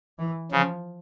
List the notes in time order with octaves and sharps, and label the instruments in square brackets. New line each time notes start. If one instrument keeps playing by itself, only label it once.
[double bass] E3
[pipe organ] C#3 [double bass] F3